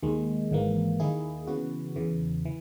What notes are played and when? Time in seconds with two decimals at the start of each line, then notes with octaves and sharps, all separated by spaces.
0.03 D#2 D#3 G#3
0.51 G#1 G#2 E3 A#3
1.00 D#2 D#3 A#3 E4 G#4
1.47 C#3 E3 B3 F#4
1.96 E2 C#3 E3
2.45 E3